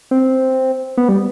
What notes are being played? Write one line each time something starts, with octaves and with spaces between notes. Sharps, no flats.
C4
B3
G3